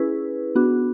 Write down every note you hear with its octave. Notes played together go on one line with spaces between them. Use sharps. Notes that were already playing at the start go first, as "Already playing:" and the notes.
Already playing: C#4 E4 G#4 B4
B3 D4 F#4